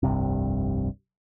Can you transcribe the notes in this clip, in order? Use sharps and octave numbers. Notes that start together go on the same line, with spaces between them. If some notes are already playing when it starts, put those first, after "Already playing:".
F1 C2 G2 C3